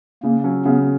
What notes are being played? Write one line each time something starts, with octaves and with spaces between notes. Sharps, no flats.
C#3 A#3
F#3 C#4
C#3 B3